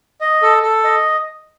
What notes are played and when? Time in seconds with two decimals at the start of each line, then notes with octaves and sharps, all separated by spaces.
0.21 D#5
0.42 A4
0.63 A4
0.84 D#5